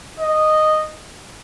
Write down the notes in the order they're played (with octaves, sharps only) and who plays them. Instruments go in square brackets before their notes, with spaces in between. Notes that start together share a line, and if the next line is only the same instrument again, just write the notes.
[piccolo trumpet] D#5